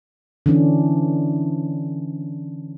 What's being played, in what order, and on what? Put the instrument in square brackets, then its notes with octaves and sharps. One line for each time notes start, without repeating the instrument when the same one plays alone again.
[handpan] D3 E3 C#4 D4